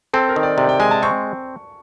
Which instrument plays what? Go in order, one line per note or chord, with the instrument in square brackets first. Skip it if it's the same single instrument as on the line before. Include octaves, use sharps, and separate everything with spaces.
[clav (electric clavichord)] C4 [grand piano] A4
[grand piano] A#4
[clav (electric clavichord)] D#3
[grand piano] D5
[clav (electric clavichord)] C3 [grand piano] D5
[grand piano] G5
[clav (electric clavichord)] G#3 [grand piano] G#5
[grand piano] A5
[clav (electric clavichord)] C4 [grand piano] C#6